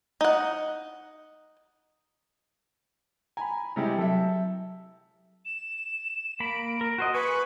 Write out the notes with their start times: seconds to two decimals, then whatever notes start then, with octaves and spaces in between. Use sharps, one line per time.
0.21 D#4 F#5
3.37 G#5 A#5 B5
3.76 C3 G3 G#3 E4 G5
3.98 F#3 A4 E5
5.45 E7
6.40 A#3 B5 D7
6.81 A#4
6.98 F#4 C5 D#5
7.14 G#4 B4 G#5 C#6 C#7